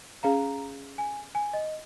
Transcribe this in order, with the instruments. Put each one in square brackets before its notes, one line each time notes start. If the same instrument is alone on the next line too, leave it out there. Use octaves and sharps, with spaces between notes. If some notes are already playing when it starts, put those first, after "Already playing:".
[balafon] C#4 G#4 F5 [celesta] A#5
[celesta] G#5
G#5
D#5